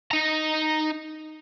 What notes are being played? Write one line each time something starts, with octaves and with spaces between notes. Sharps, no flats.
D#4 A#5